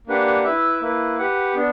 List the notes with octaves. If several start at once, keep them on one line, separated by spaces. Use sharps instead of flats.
A#3 D4 G4 B4 F#5
E4 B4 E5
A#3 E4 B4
G4 B4 F#5
B3 D4